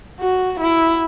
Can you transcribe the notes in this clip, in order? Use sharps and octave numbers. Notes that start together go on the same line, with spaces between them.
F#4
E4